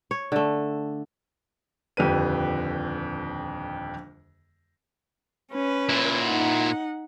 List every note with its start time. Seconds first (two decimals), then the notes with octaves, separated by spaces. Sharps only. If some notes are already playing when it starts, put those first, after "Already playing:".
0.11 C#5
0.32 D3 A3
1.97 D#1 F2 D3 G4 B4 D#7
5.52 C#4 B4
5.89 A#2 E4
6.23 D#4 F#5